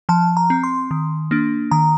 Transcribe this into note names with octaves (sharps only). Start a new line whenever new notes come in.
F3 A5
A#5
C4
C6
D#3
A#3 D4
D#3 A#5